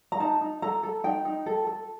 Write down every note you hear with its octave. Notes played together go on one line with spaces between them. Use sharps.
A#5
D#4 A5
D#4
A4 A#5
A4
D#4 G5
D#4
A4
A4